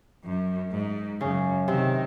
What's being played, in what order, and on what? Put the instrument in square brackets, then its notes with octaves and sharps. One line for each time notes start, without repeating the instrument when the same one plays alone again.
[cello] F#2
G#2
[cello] F#2 [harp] C#3
[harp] C3 [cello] D#3